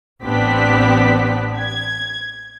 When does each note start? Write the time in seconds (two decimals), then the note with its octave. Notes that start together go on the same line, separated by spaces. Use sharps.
0.23 A1 B3 C4 D4 G4 B6
1.58 G#6